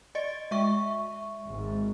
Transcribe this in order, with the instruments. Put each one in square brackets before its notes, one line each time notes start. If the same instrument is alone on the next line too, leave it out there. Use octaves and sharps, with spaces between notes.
[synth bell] D5 D#5 A6
G#3 E5 C#6
[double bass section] G#1 G#2